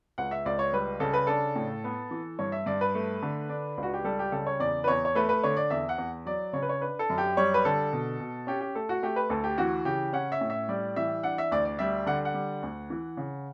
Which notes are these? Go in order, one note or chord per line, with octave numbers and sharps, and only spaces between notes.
C#2 F#5
E5
C#2 D5
C#5
G3 B4
C#3 A4
B4
D4 A4
A2
B3
E3
G2 C#5
E5
G2 D5
B4
A3
D3
D4
C#2
F#4
G4
G3 A4
G4
C#3 A4
C#5
E2 D5
B4
E2 C#5
C#5
A3 B4
B4
D3 C#5
D5
E2 E5
F#5
E2
F#3 D5
C#3 C#5
B4
C#5
D4 B4
A4
F#2
G4
G3 C#5
B4
D3 A4
B2
B2
C#4 G4
G4
A3 A4
F#4
A3 G4
B4
D2 A4
G4
E3 F#4
C#3 G4
C#4 F#5
E5
A2
E5
G3 D5
E3 E5
D4 F#5
E5
D2 D5
D5
G3 E5
D3 F#5
F#5
G3
D2
E3
C#3